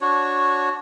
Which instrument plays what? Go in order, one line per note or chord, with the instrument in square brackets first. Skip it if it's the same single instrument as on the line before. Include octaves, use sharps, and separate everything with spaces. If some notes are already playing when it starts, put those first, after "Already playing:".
[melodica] D4 F#4 C#5